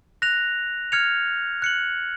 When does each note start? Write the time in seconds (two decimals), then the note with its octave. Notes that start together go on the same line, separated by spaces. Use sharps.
0.22 F#6 A#6 F7
0.92 F6 G#6 C#7 F7
1.62 F#6 C#7 F#7